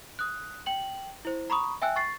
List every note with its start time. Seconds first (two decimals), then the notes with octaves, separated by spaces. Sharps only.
0.19 D#6 F#6
0.66 G5 F#7
1.25 E4 C5
1.50 A#5 B5 C#6 D#6
1.82 E5 G5 G#5 E6 F#6
1.96 C#6 A6 C7